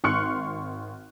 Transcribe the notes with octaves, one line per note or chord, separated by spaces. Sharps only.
G#1 C6 C#6 F6 F#6 C#7